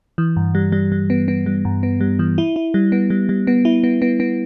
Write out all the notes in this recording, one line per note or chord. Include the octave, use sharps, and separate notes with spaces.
E3
G2
G3
G3
G3
B3
B3
G3
G2
B3
G3
E3
E4
E4
G3
B3
G3
G3
B3
E4
B3
B3
B3